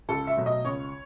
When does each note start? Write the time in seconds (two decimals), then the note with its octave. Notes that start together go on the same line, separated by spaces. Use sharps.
0.09 C#2 A4
0.27 E5
0.37 B2 F#3 A3
0.46 D#5
0.65 C#2 C#5